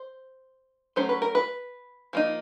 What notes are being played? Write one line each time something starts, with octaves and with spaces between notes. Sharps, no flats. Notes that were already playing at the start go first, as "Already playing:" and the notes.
Already playing: C5
F#3 A3 C#4 C5
B4
A#4
B4
F3 A#3 D#4